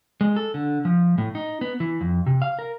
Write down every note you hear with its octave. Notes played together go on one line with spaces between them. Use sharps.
G#3
A4
D3
F3
A2
D#4
B3
E3
F2
C3
F5
A#4